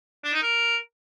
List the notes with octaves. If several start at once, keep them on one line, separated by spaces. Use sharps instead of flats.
D4
D#4
A#4